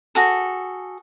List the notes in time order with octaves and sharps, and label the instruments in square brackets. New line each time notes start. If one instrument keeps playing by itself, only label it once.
[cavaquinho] F#4 G#4 A4